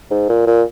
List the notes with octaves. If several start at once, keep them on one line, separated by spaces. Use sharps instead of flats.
G#2
A#2
A#2